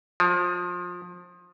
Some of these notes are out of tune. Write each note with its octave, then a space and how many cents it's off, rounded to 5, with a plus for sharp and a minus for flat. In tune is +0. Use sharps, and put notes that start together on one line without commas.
F3 +25